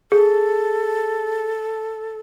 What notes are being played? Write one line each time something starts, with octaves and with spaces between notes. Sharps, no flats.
G#4 A4